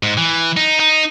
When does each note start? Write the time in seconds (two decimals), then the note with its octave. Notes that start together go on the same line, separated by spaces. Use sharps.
0.03 G#2
0.17 E3
0.57 D#4
0.80 D#4